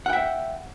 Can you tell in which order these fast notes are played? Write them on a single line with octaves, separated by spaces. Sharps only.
F#5 G5 E5